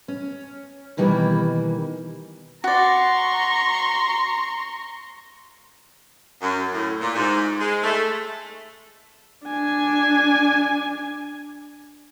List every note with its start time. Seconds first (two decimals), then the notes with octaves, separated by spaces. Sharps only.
0.08 C#4
0.97 B2 D#3 E3 G3 A#3
2.64 F#4 D5 A#5 C6 C#6
6.41 F#2
6.72 A2
7.00 A#2
7.15 G#2
7.58 G#3
7.83 A3
9.47 D4 G#5